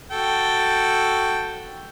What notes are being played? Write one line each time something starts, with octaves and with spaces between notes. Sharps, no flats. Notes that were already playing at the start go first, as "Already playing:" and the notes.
F#4 A4 G5